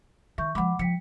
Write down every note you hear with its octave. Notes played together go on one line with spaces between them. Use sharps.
D#3 E5 C#6 G6
F3 G#3 F#5 B5 D6
F3 G5 B6 C#7